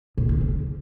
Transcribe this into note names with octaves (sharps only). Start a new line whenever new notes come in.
A#2
D3
C#3